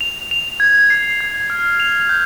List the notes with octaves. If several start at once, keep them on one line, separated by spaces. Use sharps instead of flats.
F7
F7
G#6
C7
G#6
F6
F7
G6